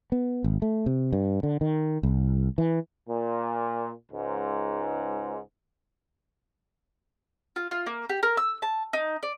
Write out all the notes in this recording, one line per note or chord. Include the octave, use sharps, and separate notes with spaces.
B3
G#1
A3
C3
G2
D3
D#3
C2
E3
A#2
C#2 G#2
F4
F4
A#3
G4
A#4
E6
A5
D#4
D5